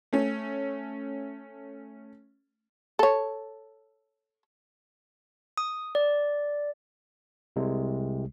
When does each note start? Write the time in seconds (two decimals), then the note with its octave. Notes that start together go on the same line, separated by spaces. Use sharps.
0.13 A3 C#4
2.99 A4 C#5
5.57 D#6
5.95 D5
7.56 C2 C3 G#3